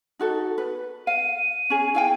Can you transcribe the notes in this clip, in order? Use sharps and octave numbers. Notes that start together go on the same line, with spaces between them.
D#4 F#4 A4
B4
F5 D#7
C#4 G#4
E4 F5 G5